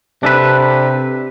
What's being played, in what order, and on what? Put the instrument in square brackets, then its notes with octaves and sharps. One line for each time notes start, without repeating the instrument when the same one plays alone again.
[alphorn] C3 [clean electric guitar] D4 A4 B4